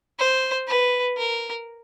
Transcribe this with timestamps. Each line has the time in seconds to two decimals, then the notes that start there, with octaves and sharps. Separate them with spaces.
0.19 C5
0.68 B4
1.17 A#4